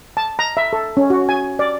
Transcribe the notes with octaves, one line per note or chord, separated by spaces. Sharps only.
A5
A#5
E5
A4
C#4
F#4
G#5
D5